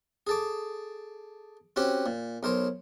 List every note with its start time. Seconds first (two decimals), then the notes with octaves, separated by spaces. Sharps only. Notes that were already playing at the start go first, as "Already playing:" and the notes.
0.27 G#4 A4 D6
1.76 C4 C#4 F#4 G4 C#5
2.06 A#2
2.43 B1 A#4 C5 C#5